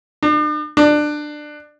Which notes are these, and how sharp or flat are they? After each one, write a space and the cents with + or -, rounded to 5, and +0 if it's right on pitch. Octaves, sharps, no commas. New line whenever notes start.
D4 +45
D4 +20